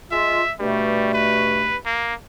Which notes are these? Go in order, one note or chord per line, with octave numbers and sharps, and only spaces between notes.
G#3 F4 E5
G2 B2 G3 A3
B4
A#3